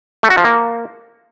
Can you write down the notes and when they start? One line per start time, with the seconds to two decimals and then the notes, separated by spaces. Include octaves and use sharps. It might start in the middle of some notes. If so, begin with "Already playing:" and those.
0.23 A3
0.30 F#4
0.37 F3
0.44 A#3